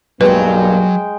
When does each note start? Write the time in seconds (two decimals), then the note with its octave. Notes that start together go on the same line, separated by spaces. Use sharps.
0.21 B1 G2 F#3 G#3 A#3 B4 G5